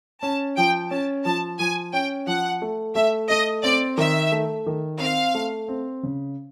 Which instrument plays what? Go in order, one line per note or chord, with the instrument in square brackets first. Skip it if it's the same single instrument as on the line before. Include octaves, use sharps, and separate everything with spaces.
[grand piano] C#4 [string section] A5
[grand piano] F3 [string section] G5
[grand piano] C#4 [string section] A5
[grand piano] F3 [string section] A5
[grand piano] F3 [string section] G#5
[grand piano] C#4 [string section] G5
[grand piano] F3 [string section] F#5
[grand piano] A3
[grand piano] A3 [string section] E5
[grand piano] A3 [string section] D#5
[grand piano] C4 [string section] D5
[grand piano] D#3 [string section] E5
[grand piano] A3
D#3
[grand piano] C4 [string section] F5
[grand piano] A3
C4
C#3